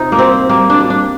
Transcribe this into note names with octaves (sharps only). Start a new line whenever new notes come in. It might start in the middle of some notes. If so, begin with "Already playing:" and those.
Already playing: C3 D#4 F4
A#3
G3 C4
G3 A#3
D4
G3
D4